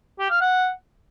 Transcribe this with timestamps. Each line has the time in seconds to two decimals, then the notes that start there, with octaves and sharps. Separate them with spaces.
0.19 G4
0.30 F5
0.41 F#5